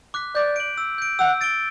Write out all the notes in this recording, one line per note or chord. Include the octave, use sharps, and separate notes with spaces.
D6 F#6 B6
D5 G6
D7 F#7
E6
G6 D7
F#5 E6
A6 D7 G7